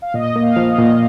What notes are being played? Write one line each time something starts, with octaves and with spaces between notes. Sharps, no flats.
F5
A#2 D#5
A#3
F5
F3
D#5
A#2